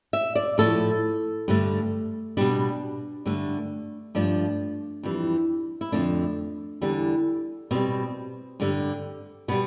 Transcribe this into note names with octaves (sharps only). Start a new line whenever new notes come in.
E5
D5
A2 F3 A3 A4
G2 D3 A3
B2 G3 D4
G2 D3 A3
G2 F3 A3 D4
F2 E3 G3
E4
F2 D3 A3 D4
E2 D3 G3
B2 G3 C4
G2 D3 G3
B2 G3 B3